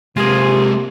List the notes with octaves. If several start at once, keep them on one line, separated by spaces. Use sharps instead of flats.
C3 G#3 A#3 F4 G4 G#4